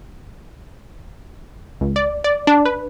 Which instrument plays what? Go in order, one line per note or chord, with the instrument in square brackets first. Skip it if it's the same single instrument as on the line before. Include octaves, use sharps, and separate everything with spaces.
[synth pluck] C#2
D5
D5
D4
B4